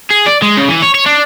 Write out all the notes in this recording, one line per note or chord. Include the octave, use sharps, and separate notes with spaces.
G#4
D5
G#3
C#3
E3
C#5
C#5
D4